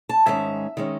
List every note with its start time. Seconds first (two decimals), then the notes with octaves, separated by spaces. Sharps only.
0.09 A5
0.26 G#2 D#3 G#3 C#4 E5
0.77 D#3 G#3 C#4